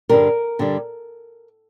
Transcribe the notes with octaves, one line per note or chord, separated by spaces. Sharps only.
G2 D3 G3 A#4
G2 D3 G3